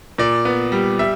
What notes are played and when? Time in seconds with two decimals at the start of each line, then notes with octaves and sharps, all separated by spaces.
0.18 A#2 D5
0.45 B3
0.72 G3
0.99 G3 E5